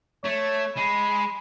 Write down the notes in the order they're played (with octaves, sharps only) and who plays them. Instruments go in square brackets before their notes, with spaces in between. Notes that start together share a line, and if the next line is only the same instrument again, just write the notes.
[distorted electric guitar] A3 [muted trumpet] C#5
[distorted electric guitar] G#3 [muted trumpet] B5